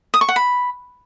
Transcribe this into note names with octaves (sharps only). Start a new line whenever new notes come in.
D#6
C#6
F#5
B5